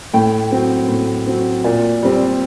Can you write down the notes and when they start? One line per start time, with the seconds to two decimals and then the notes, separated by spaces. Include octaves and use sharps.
0.14 A2 G5
0.51 F#3 C4
0.89 A2
1.27 F#3 C4
1.64 A#2
2.03 G3 C4